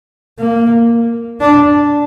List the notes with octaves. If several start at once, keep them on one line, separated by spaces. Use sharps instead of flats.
A#3
D4